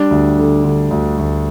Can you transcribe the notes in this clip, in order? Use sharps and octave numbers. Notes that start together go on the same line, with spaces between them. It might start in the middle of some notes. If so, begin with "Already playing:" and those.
Already playing: G3 D4
D2
D3
D3
D2
D2